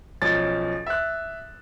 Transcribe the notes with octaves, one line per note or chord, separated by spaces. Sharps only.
B1 F3 C#4 A6
E5 F#6